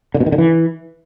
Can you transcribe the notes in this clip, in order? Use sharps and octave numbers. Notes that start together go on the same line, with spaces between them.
D3
B2
D#3
D3
E3